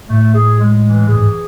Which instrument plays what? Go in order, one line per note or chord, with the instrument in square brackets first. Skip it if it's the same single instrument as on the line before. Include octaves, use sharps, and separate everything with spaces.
[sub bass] A2 [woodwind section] A3
[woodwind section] G#4
G#3
E3
[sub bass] A2 [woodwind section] G#4
[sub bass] G#2